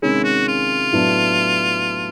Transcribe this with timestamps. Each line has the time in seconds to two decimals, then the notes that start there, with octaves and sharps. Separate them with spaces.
0.02 C3 D#3 G#3 C#4 E4
0.24 F#4
0.48 F4
0.93 A2 F#3 B3 D4